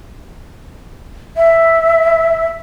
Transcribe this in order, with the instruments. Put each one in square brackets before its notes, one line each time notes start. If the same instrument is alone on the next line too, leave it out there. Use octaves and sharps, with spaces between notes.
[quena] E5